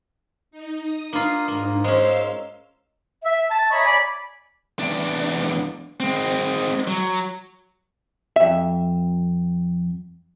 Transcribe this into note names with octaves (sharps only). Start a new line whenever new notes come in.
D#4
D#6
A#3 D4 F4
G#2 A#3
G#3 C#4 C5 F5 C6 E6
E5
A5
C#5 D#5 E5 A#5 B5 C#6
D5 G#5 B5
E2 D4
G#3 C4
F#3
F2 E5